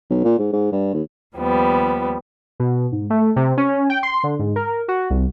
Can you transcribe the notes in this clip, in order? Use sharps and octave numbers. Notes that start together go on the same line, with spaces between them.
B1
A#2
G#2
G#2
G2
D#2
D#2 F3 G3 B3
B2
G#2
A3
C3
C#4
G5
C6
D3
G#2
A#4
F#4
C2